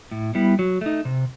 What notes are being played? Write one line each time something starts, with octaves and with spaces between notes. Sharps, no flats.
A2
G3 B3 E4
F#3
A3 D#4
C3